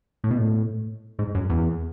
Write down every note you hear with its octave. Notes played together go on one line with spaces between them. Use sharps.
A2
B2
A2
G#2
F#2
E2